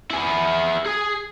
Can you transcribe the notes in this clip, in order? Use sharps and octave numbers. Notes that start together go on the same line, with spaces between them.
E4 G#4
G#4 G#5